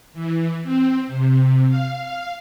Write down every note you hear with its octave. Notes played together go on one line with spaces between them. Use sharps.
E3
C4
C3
F5